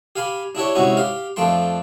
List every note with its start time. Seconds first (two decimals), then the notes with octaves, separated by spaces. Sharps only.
0.16 G4 F5 G#5 B5
0.55 D4 E4 G4 C#5
0.75 G#2 C3 C#4 E4 F#4
0.97 G4 F5
1.36 F2 F3 A3 D4 G5 C6